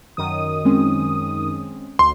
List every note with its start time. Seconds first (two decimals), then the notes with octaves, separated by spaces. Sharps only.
0.17 F#2 D#3 D#6
0.65 G#3 C4 C#4
1.99 D2 C6